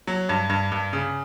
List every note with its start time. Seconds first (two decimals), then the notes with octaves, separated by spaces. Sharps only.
0.07 F#3
0.29 G2
0.49 G2
0.72 G2
0.93 C#3